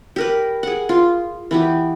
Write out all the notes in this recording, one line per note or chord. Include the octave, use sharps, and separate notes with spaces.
G4 A#4 B4
G#4 F#5
F4
E3 B3 G4